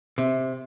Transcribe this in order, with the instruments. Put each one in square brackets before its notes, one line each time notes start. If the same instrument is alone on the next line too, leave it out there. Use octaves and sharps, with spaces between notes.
[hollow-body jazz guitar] C3